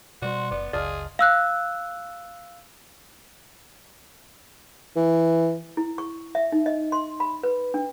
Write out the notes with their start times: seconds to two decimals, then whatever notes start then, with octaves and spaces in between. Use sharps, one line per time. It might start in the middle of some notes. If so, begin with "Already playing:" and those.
0.22 B2 G3 F#4 C5 D5
0.51 F#1 B3 D5
0.73 F#1 C#2 G#4 D5 D#5 F5 A5
1.19 F5 E6 F#6
4.96 E3
5.77 E4
5.98 C#6
6.35 E5
6.52 D#4
6.66 D#5
6.92 C6
7.20 B5
7.43 B4
7.74 D4